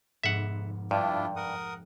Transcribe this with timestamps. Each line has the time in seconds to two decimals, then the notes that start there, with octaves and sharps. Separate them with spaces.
0.24 F1 G#2 B3 E5 F#5
0.91 G2 D4 E4 F4 G5
1.36 A#4 F#5 D#6